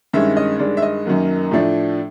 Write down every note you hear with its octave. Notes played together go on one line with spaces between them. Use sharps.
G2 D#3 G#3 C#4 E5
D#5
G2 D#3 G#3 D5
E5
D#5
F#2 D#3 F#3 A#3
A2 F3 A3 D4